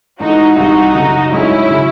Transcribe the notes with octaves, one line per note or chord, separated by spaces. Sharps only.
G#2 E3 A3 D#4 F#4
C2 C3 E3 D#4 F#4
F#2 C#3 F#3 A3
G#2 F#3 A3 C#4 D#4 E4
C#3 F#3